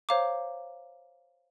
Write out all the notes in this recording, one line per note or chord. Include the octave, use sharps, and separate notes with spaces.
C5 C#5 F5 A#5 D6